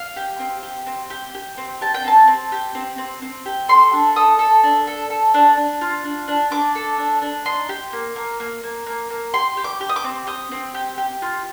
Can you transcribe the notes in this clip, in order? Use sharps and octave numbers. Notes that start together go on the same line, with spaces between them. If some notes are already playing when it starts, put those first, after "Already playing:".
Already playing: F5
G4
C4
G4
C4
G4
G4
C4
G4 A5
G5
C4 A5
C4
G4
C4
C4
C4
G4
A4 C6
D4
A4 D#6
A4
D4
A4
A4
D4
D4
F4
D4
D4
D4 D6
A4
D4
D4
D#4 C6
G4
A#3
A#3
A#3
A#3
A#3
A#3
G4 C6
G4
D6
G4
D#6
D6
C4
G4 D#6
C4
G4
G4
F4